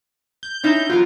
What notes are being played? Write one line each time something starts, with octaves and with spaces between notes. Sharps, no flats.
G6
C#4 D#4 E4
E2 F#3 F4 A#4